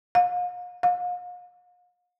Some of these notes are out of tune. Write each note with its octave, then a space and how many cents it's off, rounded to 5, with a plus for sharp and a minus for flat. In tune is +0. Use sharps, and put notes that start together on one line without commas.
F5 +40
F5 +40